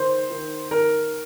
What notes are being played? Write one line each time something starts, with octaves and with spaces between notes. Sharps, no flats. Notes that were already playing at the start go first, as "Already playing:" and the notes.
Already playing: D#3 C5
D#3
D#3 A#4